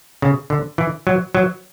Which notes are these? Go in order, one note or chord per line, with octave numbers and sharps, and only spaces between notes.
C#3
D3
E3
F#3
F#3